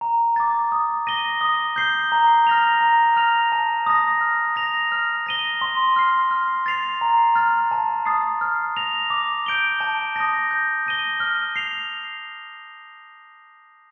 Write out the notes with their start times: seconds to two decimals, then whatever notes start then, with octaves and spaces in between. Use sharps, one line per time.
0.01 A#5
0.36 D6 A6
0.72 D#6
1.07 A#6 D#7 G7
1.41 D#6
1.76 G6 C7 G7
2.12 A#5
2.47 F6 A#6 F7
2.81 A#5
3.16 F6 A#6 F7
3.52 A5
3.87 D#6 A#6
4.21 F6
4.56 A#6 F7
4.92 F6
5.26 A#6 D#7 G7
5.61 C6
5.96 F6 C7
6.31 F6
6.66 A6 C7 F7
7.01 A#5
7.35 F6 A6
7.71 A5
8.05 D#6 A6 C7
8.41 F6
8.77 A#6 F7
9.10 D6
9.46 G6 D7 G7
9.81 A5
10.16 D#6 A#6
10.51 G6
10.86 A#6 D#7 G7
11.20 F6
11.56 C7 F7